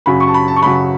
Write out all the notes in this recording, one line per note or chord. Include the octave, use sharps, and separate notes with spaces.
F#2 C#3 F#3 B5
C#6
A5
B5
A5
C#6
F#2 C#3 F#3 B5